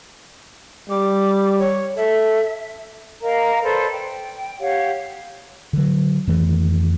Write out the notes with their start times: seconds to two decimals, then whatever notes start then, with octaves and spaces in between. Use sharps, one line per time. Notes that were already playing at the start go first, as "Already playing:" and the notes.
0.90 G3 D6
1.59 C#5
1.97 A4 E5
3.23 A#4 D#5 F5 A#5
3.63 A4 B4 C5 D5
3.92 G5
4.60 G4 C#5 F5 F#5
5.73 D3 F#3
6.27 F2 D#3 E3 A3